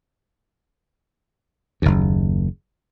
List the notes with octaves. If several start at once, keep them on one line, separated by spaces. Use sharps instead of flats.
F#1 D#2